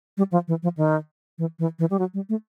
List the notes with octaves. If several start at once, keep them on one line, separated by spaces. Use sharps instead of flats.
G3
F3
E3
F3
D#3
E3
E3
E3
G3
F#3
G3
A3